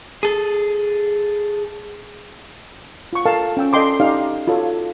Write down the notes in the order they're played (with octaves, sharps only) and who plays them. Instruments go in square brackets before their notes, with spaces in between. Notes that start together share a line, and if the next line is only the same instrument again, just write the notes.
[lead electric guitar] G#4 A4
[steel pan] F4 C#6
A4 A#4 F5 A5
C#4 G5 E6
A4 D5 D#5 G5 C6 D6
D#4 G4 D5 F5
F4 F#4 A4 C#5